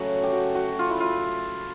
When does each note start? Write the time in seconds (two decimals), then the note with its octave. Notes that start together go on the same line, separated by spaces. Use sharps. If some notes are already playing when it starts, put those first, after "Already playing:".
Already playing: C#3 F#3 A3 F#4
0.23 G4
0.33 F#4
0.55 F#4
0.79 F4
0.90 E4
1.00 F4